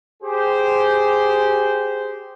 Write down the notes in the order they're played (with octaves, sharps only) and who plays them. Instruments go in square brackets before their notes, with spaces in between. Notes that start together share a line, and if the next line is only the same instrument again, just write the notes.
[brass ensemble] G4 G#4 C5